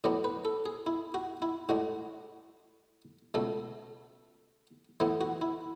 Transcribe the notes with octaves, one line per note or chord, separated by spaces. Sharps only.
A2 F#3 B3 D4 D5
B4
A4
G#4
E4
F#4
E4
A2 G#3 D4 F#4
C#2 B2 A3 A4
A2 E3 B3 E4
F#4
E4